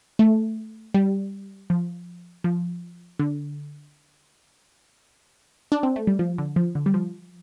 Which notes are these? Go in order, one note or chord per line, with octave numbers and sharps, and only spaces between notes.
A3
G3
F3
F3
D3
D4
C4
A3
G3
F3
D3
F3
D3
G3
F3